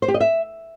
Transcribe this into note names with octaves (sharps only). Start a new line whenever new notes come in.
C5
G4
D#5
E5